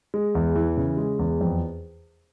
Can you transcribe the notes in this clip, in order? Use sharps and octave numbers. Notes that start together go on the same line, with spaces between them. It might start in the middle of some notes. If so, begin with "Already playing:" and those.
G#3
E2
E3
C#3
G#3
E2
F2